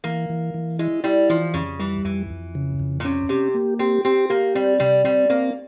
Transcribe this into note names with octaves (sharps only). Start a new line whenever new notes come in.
E3 A#3
E3
E3
G#3 E4
G3 E4
E3 F3
F2 C#3
E3 G3
F2 E3
F2
C#3
F2
A#2
C3 C#4
C3 G4
A#3
C4 G4
C4 G4
A#3 G4
G3 C4
C3 G3
G3 C4
A#3 C4